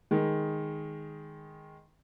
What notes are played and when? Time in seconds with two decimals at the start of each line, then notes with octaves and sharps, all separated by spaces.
0.11 D#3 G#3